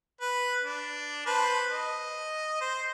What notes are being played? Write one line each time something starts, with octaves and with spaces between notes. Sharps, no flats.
B4
D4
B4 C5 A5
D#5
C5